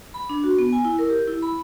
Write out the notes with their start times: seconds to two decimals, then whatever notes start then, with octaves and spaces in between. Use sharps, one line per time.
0.14 B5
0.29 D4
0.44 F#4
0.58 B3
0.73 G#5
0.85 E4
0.99 A#4
1.10 G4
1.28 E4
1.42 B5